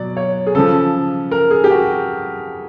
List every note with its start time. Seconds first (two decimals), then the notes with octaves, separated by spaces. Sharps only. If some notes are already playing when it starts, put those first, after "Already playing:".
Already playing: B2 F#3 D5
0.17 C#5
0.47 G#4
0.55 C#3 F3 A4
1.31 A#4
1.51 G#4
1.64 G4
1.71 F#4